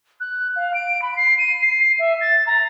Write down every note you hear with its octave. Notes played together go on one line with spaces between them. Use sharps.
F#6
F5
D7
B5
C7
D#7
C7
E5
A6
A#5